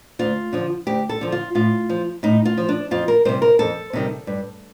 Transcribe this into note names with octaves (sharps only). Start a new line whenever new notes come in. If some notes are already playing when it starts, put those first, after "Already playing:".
D2 F4
D3 F3
D2 G4
A4
D3 F3
F4
A2 F4
F3
A2 D#4
F4
F3
D4
F2 F4
A#4
C3 D#3 G3 C5
A#4
F2 A4
C3 D#3 G3
G2